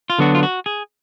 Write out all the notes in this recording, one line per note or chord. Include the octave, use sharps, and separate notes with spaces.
F4
D3 F#3 B3 D4 F#4
F4
F#4
G#4